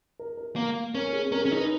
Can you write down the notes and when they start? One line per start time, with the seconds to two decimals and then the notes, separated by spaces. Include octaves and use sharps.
0.19 A#4
0.37 A#4
0.56 A#3 A#4
0.94 C#4 A#4
1.09 A#4
1.13 G#4
1.32 C#4 A#4
1.41 G#4
1.45 C#4
1.51 D#4 A#4
1.60 B4